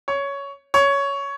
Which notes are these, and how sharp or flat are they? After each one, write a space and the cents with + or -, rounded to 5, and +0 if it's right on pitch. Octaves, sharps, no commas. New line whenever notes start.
C#5 +10
C#5 +10